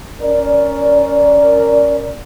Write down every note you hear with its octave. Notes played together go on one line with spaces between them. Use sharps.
C#4 A#4 D5